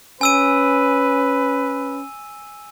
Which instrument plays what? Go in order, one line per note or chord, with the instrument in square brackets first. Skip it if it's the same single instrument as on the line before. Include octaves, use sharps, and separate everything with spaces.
[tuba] C#4 [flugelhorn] B4 [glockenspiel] G#5 E6 D#7